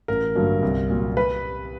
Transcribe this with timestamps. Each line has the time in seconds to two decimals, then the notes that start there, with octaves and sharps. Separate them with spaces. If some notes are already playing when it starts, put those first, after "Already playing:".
0.08 A1 A#4
0.35 G2 D3 F#3 A#3
0.62 C2
0.90 A#2 F#3
1.17 B4